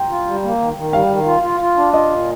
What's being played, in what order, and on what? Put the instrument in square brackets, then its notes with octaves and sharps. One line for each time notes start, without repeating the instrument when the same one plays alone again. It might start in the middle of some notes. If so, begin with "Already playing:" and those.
Already playing: [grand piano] G5 A#5 C6
[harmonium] F4
G3
A#3
D#3
D#3
[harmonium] G3 [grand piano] F5
[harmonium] D#3
F4
F4
F4
D4
[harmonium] F4 [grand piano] D#5
[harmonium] A#2